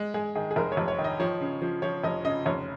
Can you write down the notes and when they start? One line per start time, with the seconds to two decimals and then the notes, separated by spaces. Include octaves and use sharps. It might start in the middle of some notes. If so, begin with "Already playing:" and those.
Already playing: G#3
0.14 G#3 G#4
0.35 D#3 G#4
0.51 G#4
0.56 F1 A#4
0.72 C#5
0.77 F1
0.88 C#5
0.99 D#3
1.04 D#5
1.20 F3 C#5
1.41 C#3
1.62 F3
1.82 F3 C#5
2.04 F1 D#5
2.25 C#3 D#5
2.46 F1 C#5